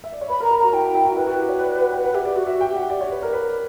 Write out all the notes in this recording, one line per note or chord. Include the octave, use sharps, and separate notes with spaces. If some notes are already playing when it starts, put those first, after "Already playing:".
E5
D5
C#5
B4 B5
A#4
A#5
A#4
F#4 A#5
E4 G5
E4
F#4
E4 B4
F#4
G4
C#5
D5
F#5
G5
B4 F#5
G4 E5
G4 D5
F#4 D5
F#4 E5
G5
G4
F#5
D5
C#5
B4
A#4
B4